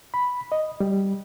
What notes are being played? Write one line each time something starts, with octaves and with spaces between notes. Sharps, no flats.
B5
D#5
G3